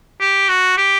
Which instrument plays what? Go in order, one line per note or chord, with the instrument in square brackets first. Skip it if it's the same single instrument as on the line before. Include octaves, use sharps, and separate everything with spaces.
[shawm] G4
F#4
G4